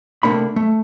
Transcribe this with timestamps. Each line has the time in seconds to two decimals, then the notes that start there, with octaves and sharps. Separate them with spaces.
0.23 C3 A3 A#3 D4 B5
0.56 A3